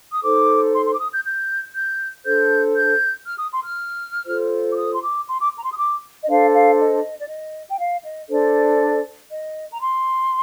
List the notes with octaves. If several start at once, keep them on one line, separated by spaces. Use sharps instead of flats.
D#6
D#4 A4 C5 D6
C6
C6
D6
D#6
G6
G6
G6
D4 A4 C5 G6
G6
F6
D#6
C6
F6
F4 A4 C5
D6
D#6
C6
D6
C6
D6
A#5
C6
D#6
D6
D#5
D4 A4 C5 F5
F5
D#5
D5
D#5
G5
F5
D#5
D4 A4 C5 D5
D#5
A#5
C6